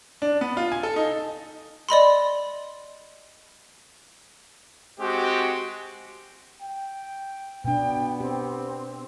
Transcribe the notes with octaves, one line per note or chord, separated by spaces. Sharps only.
D4
B3
F4
G#5
A4
D#4
D5 D#5 B5 C6
G#3 C4 F#4 G4
G5
B2 B3 D4 G5
C4 G4